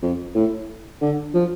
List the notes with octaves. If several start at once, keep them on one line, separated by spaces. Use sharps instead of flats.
F2
A2
D3
F3